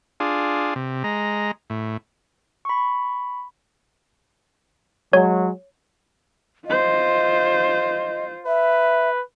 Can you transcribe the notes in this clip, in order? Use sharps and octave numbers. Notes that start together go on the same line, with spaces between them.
D4 F4 G#4
C3
G#3 A#5
A2
B5 C#6
F#3 G#3 C#5
F4 C5 D#5
B4 E5